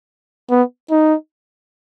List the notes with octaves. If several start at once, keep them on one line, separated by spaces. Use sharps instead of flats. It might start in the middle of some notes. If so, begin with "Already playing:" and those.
B3
D#4